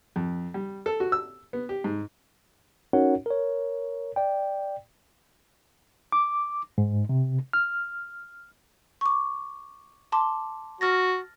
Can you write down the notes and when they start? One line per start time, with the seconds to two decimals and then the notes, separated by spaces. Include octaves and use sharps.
0.16 F2
0.54 G3
0.86 A4
1.00 F#4
1.12 E6
1.53 B3
1.69 G4
1.84 G#2
2.93 C#4 D#4 F#4 A#4 C#5 F#5
3.26 A#4 C#5
4.16 D5 G5
6.12 D6
6.78 G#2
7.09 C3
7.53 F6
9.01 C#6 D6
10.12 A5 C6 D6
10.81 F#4 F6 A6 A#6